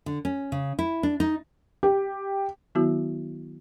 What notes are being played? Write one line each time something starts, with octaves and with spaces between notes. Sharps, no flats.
D3
C#4
C#3
E4
D4
D#4
G4
D#3 F#3 B3 E4 F#4